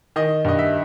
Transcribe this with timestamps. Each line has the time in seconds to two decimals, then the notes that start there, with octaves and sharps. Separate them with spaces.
0.16 D#3 D#5
0.45 G2 D#5
0.59 E5